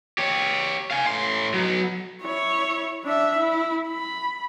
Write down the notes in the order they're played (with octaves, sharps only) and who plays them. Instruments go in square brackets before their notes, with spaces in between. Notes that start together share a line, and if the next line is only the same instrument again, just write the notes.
[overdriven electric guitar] G4 C#5
F5 G#5
A2 C6
F#3 B3
[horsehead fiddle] E4 C#5
D4 E5
E4
B5